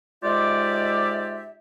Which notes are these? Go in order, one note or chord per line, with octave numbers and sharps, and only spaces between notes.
G#2 G#3 F4 G4 D5 E5